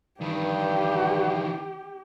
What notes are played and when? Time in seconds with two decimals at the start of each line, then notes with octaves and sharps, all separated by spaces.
0.21 G2 D#3 E3 G4